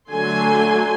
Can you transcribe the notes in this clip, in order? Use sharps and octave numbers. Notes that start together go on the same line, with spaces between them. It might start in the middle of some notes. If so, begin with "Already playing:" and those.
D3 F#3 A3 A4 G#5 C6